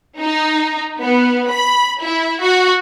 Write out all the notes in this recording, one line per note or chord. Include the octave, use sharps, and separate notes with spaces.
D#4
B3
B5
E4
F#4